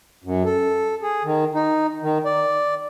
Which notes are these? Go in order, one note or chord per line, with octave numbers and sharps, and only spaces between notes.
F#2
A4
G#4
D#3
D#4
D#3
D5